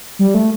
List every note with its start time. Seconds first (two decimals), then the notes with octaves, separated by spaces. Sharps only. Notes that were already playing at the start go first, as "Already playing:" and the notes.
0.19 G3
0.34 A3